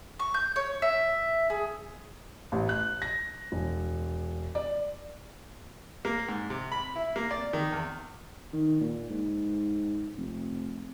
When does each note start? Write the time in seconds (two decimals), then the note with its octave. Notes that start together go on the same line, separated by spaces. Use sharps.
0.19 C#6
0.34 G6
0.56 C#5
0.82 E5
1.50 G#4
2.52 A1
2.69 F#6
3.02 A#6
3.52 E1
4.55 D5
6.05 A#3
6.28 G#2
6.50 C3
6.72 B5
6.95 E4
7.16 A#3
7.31 D5
7.53 D#3
7.72 E2
8.53 D#3
8.81 A#2
9.10 G#2
10.17 F1